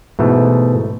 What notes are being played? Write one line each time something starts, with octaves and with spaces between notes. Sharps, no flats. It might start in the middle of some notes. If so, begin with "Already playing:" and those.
G#2 B2 E3 A3